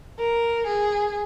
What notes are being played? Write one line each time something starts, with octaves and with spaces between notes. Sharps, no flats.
A#4
G#4